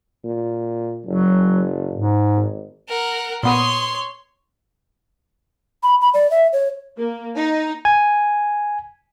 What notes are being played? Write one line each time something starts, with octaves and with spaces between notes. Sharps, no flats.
A#2
F#1 F#3
G#2
G#1
A#4 F#5
A#2 B3 C#5 C6 D#6
B5
B5
D5
E5
C#5
A#3
D#4
G#5